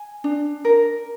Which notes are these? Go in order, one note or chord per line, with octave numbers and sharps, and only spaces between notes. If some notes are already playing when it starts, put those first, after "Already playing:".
Already playing: G#5
D4
A#4